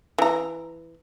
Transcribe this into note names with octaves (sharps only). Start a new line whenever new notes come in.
E3 A#5